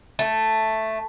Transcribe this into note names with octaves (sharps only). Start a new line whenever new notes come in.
A3